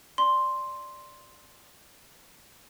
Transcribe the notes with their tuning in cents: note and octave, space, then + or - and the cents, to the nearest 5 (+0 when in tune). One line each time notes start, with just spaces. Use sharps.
D5 +0 C6 +0